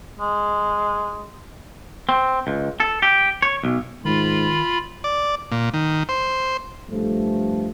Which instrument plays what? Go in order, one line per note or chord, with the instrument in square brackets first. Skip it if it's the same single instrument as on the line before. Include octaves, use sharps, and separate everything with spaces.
[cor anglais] G#3
[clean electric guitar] C4
C#2
A4
G4
C#5
B1
[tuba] G#2 [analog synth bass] D#3 [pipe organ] F4 B5
[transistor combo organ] D5
A#2
D#3
C5
[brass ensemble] G2 F3 A3